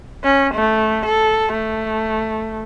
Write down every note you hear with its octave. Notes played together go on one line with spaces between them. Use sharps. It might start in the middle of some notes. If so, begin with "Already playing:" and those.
C#4
A3
A4
A3